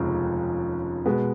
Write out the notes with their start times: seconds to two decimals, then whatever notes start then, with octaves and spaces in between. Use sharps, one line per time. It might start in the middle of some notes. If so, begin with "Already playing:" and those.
Already playing: F1 D#2 C#3 F3 G#3
1.06 B2 G#3 B3